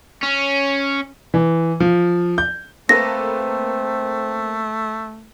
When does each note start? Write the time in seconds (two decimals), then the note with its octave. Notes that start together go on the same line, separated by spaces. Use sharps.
0.23 C#4
1.34 E3
1.80 F3
2.38 G6
2.89 A3 A#3 C4 A4 B4 A#6